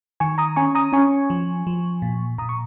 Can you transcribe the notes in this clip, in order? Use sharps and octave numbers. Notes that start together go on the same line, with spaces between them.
D#3 G#5 C#6
A#5 D#6
C#4 G#5 C#6
A#5 D#6
C#4 G#5 C#6
F3
F3
A#2
A#2 A#5 D#6
C#6